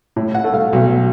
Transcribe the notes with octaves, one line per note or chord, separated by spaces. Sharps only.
A2
F#5
A3
F5
B1